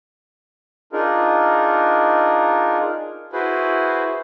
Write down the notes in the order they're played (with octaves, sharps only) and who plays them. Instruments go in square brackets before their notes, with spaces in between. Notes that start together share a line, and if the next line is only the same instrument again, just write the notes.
[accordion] D4 D#4 F4 G#4 A#4
[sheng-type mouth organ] E4 F#4 G#4 B4 C5